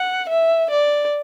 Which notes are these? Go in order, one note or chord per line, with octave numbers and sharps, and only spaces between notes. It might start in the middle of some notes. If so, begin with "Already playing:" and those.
Already playing: F#5
E5
D5